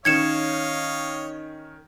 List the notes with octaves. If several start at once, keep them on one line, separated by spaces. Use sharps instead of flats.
D#3 C#4 C#5 D#5 F5 G#6 C#7 E7